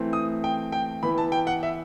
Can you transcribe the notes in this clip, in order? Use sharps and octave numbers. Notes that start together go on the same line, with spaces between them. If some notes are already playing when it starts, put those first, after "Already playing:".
Already playing: E3 A3 C4
D#6
G5
G5
E3 B3 B5
A5
G5
F#5
E5